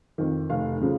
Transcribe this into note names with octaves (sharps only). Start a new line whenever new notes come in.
F2 D#3
F1 F5
C#3 F3